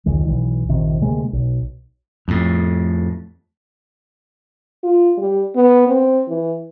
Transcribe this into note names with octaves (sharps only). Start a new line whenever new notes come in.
F1 C#2 D#3 G#3
B1 E3
D#1 A#1 C3 D#3
D2 C3 G#3 A#3
B1
F2 A2
F4
G3
B3
C4
E3